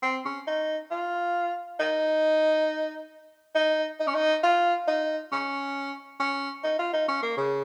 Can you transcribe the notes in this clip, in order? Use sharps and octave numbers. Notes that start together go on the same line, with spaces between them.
C4
C#4
D#4
F4
D#4
D#4
D#4
C#4
D#4
F4
D#4
C#4
C#4
D#4
F4
D#4
C#4
A#3
C#3